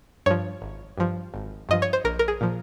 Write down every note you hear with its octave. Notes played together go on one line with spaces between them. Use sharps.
G2 F3 C#5
G#1
G2 F3
G#1
G2 F3 D#5
C#5
C5
A#1 A#4
A#4
G#4
A#2 F3